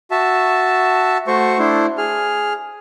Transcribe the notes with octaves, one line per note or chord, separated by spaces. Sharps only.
F#4 E5 A5
A3 F#4 C5 C#6
A3 D4 E4 C5
G#4 F6